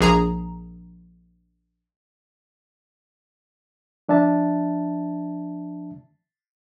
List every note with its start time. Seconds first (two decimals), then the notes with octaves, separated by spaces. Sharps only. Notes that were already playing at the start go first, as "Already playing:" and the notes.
0.01 A#1 G#4 A#5
4.09 F3 D4 E5 A5